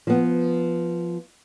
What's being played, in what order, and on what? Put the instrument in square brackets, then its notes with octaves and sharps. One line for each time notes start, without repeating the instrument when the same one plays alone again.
[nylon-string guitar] F3 B3